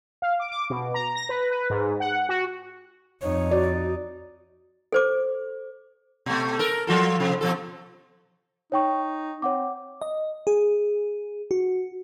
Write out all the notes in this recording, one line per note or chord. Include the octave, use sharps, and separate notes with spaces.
F5
D6
D6
B2
A#5
A#6
B4
B4
G#2
F#5
F#4
F2 D#4 C#5
F#4 D5
A4 C5 D6
B2 A3
A4 A#4
F3 F4 A4
C3 F3
B2 F3 A4
D#4 C#5 G5 C#6
C4 C#5 F#5 D6
D#5
G#4
F#4